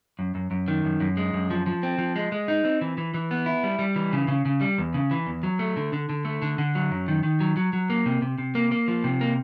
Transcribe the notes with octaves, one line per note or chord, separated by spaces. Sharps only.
F#2
F#2
F#2
D#3
F#2
F#2
G#3
F#2
F3
F3
C4
F3
G#3
G#3
D#4
C4
E3
E3
E3
B3
E4
G3
G3
E3
C#3
C#3
C#3
G3
E2
C#3
E3
E2
F#3
A3
D3
D3
D3
A3
D3
D3
F#3
F#2
D#3
D#3
F#3
F#3
F#3
A#3
C3
C3
C3
A#3
A#3
F3
C3
A#3